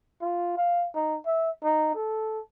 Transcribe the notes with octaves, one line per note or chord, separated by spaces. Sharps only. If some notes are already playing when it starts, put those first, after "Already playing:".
F4
F5
D#4
E5
D#4
A4